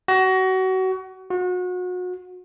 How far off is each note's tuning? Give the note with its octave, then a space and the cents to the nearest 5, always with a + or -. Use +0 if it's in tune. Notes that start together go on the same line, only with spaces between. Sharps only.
F#4 +25
F#4 -35